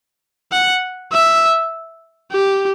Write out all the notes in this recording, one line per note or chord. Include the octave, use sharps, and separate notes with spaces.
F#5
E5
G4